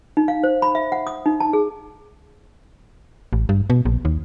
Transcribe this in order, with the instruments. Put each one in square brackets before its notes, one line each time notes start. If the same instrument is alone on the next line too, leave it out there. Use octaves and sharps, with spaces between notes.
[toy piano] D#4
F5
C5
B5
E5
F#5
D#6
D#4
A5
G#4
[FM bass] A1
G2
B2
A#1
D#2